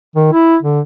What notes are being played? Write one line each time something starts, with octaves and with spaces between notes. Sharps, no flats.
D#3
E4
D3